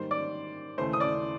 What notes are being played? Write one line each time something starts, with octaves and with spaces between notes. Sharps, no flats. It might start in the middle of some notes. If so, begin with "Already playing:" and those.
Already playing: G#2 D#3 G3 A#3 C5 C6
D5 D6
D#2 C#3 E3 A3 C5 C6
D#6
D5 D6